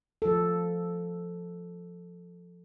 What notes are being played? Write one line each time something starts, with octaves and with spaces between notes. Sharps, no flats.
F3 A4